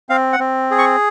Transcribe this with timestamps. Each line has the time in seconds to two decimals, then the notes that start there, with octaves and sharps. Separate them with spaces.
0.09 C4 F5
0.33 F#5
0.40 C4
0.71 G#4
0.78 C#6